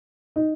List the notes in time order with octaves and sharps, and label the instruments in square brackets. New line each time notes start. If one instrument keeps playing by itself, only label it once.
[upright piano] D#4